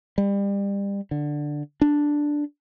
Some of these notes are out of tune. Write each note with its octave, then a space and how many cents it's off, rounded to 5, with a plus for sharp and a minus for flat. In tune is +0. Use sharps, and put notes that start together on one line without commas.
G3 +30
D3 +5
D4 +0